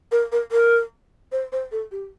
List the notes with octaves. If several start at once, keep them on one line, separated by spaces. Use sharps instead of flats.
A#4
A#4
A#4
C5
C5
A4
G4